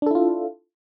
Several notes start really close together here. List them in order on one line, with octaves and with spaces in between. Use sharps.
D4 A4 E4 F4